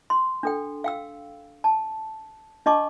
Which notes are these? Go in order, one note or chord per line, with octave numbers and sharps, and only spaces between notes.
C6
D4 A4 G5
F5 G5 E6
A5
D4 D#5 A5 C#6 D6